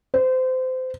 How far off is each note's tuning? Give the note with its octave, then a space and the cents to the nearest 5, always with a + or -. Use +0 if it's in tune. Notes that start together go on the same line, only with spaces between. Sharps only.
C5 -25